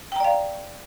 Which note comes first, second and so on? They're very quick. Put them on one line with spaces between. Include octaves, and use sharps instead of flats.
G5 A#5 D5 F5